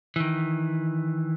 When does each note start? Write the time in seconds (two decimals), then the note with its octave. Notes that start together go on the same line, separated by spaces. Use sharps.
0.16 D#3 E3